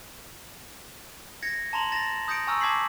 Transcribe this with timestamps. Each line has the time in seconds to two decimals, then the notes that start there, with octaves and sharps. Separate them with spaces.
1.43 G#6 A#6 C#7
1.73 A5 A#5 C6 F7 F#7
1.92 A6 A#6 E7 F7
2.28 D#6 G6 A#6 C#7 D7
2.47 G#5 A#5 C#6 E6 F6
2.61 A5 D6 G#6 B6 C7 F#7